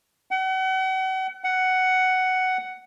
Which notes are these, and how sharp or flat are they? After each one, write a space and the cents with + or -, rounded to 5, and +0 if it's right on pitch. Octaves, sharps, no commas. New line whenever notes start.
F#5 +40
F#5 +10